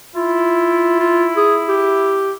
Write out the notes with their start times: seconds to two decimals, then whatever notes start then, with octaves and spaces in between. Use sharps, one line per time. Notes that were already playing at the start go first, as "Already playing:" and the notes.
0.15 E4 F4
1.00 F4
1.37 G#4
1.68 G4